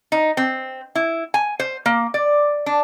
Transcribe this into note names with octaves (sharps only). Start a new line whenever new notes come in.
D#4
C4
E4
G#5
C5
A#3
D5
D4